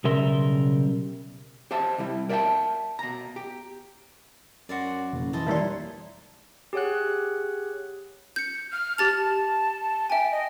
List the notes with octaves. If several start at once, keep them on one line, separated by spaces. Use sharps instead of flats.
B1 C#3 G3 A#4 E5 C6
G4 C5 E5 A5
C3 G3 E4
A#4 D5 E5 F5 G5 A5
B2 A#5
G4
F#2 F#4 C5 D5
F#1 F2 B2
E3 C5 D#5 A5
D#2 E3 G3 D5 E5 A#5 C6
G4 G#4 C#5 F#5 F#6
G6 C#7
F6
G4 A5 A6 F7
E5 G5 G#5
D#5